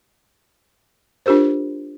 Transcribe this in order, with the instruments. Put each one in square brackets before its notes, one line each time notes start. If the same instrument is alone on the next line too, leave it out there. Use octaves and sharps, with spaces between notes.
[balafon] D4 F4 G4 A#4 C5